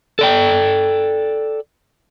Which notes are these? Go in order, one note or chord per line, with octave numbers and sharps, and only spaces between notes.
A4 D5 G5